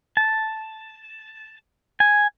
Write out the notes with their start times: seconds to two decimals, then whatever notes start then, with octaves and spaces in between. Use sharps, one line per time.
0.17 A5
2.00 G#5